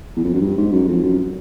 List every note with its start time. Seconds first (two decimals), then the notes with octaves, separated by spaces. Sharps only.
0.16 E2
0.25 F2
0.34 F#2
0.42 G2
0.57 G#2
0.73 F#2
0.88 F2
1.03 F#2